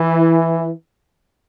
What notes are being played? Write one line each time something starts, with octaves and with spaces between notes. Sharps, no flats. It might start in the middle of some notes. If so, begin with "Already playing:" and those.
Already playing: E3